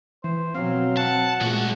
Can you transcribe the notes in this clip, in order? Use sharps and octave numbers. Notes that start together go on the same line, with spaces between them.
E3 C5
B2 F#3 C4 F5
F#5 A5
B1 A#2 G#3 A3 F#4